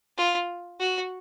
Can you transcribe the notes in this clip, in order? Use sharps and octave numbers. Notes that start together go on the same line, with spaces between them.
F4
F#4